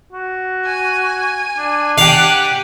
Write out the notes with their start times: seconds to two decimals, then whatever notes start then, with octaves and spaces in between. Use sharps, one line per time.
0.13 F#4
0.66 G#5
1.58 D4
1.98 G4 F5 F#5 G#5